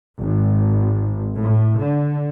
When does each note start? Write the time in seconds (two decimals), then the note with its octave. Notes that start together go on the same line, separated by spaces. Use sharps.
0.20 G#1
1.37 A2
1.79 D3